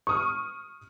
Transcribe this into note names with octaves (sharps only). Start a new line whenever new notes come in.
C#6 D#6 F6